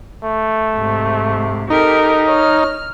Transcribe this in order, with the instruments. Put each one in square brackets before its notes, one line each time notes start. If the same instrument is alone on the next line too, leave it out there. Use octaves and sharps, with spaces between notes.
[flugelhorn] A3
[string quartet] G#2 C3
[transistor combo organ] D#4 [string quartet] G4 A4 A#4
[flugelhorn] C#5 [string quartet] F6